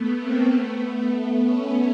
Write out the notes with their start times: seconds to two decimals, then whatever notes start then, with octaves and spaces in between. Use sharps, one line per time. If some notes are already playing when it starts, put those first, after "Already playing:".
Already playing: A3 B3
0.18 A#3 C4
0.50 A3 B3
1.12 A3 B3
1.43 B3 C#4